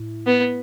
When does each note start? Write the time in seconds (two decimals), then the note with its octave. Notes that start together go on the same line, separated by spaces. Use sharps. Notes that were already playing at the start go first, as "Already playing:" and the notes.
Already playing: A2 E4
0.26 B3